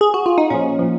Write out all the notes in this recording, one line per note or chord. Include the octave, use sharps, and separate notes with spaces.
G#4
F#4
F4
D#4
A#2 F3 C#4
A#2 F3